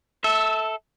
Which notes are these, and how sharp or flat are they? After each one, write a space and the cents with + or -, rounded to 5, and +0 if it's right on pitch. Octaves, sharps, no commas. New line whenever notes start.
A4 +0 E5 -20